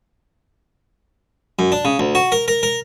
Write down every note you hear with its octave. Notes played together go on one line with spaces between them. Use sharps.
F#2
D4
C#3
D2
F#4
A#4
A#4
A#4